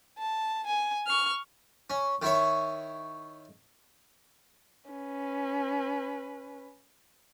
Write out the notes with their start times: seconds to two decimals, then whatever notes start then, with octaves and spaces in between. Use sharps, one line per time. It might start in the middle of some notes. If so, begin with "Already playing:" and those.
0.18 A5
0.67 G#5
1.07 C#6 F6
1.90 C#4
2.22 D#3 E4 C#5
4.90 C#4 B4